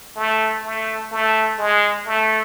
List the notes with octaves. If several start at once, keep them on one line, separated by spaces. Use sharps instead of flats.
A3
A3
A3
G#3
A3